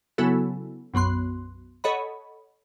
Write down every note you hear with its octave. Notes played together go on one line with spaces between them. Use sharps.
C#3 F#3 B3 E4 F#4 A4
B1 F#2 B3 C6 F#6
A4 C#5 D#5 F#5 B5